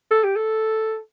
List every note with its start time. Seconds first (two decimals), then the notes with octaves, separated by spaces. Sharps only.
0.11 A4
0.24 G4
0.36 A4